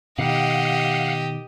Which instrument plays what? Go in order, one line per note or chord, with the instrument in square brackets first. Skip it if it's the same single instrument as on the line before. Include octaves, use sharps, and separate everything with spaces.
[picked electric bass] B2 D#3 [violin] G4 D#5 [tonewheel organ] F5 F#5